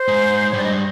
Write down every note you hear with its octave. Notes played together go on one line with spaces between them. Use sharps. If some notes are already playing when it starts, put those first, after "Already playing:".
Already playing: C5
G#2
C#5
G2 D5
D#5